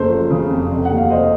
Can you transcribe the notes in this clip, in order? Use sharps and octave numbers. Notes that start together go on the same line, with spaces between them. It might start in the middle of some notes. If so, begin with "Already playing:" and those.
Already playing: F#1 A4 C5
F3
C#3
F2
F1
F#5
D#2
F5
F1 C5 D#5